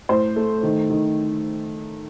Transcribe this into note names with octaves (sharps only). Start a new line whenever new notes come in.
A2 C5
A3
D#3
D#3